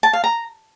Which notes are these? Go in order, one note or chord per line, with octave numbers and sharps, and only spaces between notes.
A5
F5
A#5